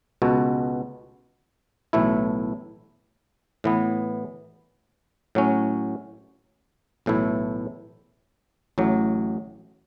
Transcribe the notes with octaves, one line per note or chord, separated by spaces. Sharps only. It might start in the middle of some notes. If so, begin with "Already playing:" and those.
C#2 B2 B3 F#4 A4
B1 A2 E3 A3 E4
A2 E3 B3
A2 F#3 C#4
B1 A2 E3 A3 E4
A1 A2 F#3